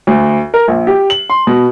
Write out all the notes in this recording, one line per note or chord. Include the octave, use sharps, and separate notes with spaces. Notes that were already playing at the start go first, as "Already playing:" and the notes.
D2
A#4
A#1
G4
F#7
C6
B2